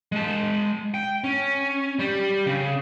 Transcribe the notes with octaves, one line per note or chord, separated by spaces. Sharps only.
G#3 A5
G5
C#4
G3
C#3